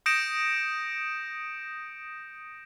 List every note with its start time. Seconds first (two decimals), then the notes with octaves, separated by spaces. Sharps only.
0.06 D#6 G6 A#6 C#7 D7 E7